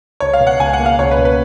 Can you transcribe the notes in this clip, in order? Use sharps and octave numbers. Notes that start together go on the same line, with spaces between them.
C#2 C#5
F5
B2
F#5
C#2 G#5
F#5
A#3
F5
C#2 C#5
B4
B2
B4